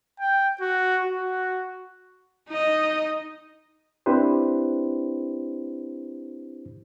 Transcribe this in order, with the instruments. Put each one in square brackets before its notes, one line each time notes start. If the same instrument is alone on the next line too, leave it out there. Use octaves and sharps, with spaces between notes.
[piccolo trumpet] G5
F#4
F#4
[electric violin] D#4 D#5
[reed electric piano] C4 D4 E4 G4 B4 C5